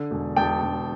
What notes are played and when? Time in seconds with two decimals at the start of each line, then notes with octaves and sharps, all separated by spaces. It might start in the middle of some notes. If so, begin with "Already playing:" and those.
Already playing: D3
0.11 E1
0.36 E1 G5 A5
0.62 E1